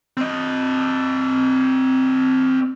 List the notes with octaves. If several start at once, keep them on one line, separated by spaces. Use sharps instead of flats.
C4 D#5